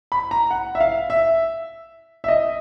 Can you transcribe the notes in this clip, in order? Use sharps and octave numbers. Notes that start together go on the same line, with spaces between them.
B5
A#5
F#5
E5
F5
E5
E5
D#5